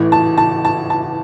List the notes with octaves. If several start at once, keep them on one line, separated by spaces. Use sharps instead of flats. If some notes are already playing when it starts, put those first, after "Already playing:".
Already playing: A1 A2 E3
A5
A5
A5
A5